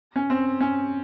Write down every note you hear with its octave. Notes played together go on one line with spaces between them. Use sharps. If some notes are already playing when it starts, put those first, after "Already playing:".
C#4
C4
C#4